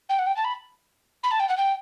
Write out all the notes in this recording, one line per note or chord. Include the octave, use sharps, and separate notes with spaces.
G5
F#5
G5
A5
B5
B5
A5
G5
F#5
G5